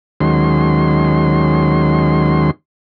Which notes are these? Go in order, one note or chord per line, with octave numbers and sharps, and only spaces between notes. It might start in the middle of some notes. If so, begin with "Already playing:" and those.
D#2 D#3 F#3 G#3 C#4 C6